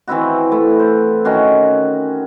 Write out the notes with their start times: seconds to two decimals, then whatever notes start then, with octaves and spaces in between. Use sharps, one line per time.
0.08 E3 C4 E4 F#4
0.52 A3 E4
0.79 C5
1.25 D#3 C#4 F#4 C6